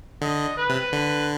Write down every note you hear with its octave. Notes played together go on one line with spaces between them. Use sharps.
D3 D#5
B4
C3
D3